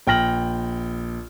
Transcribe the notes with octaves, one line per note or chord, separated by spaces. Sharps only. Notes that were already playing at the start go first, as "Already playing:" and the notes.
A#1 G5 F6 A#6 F#7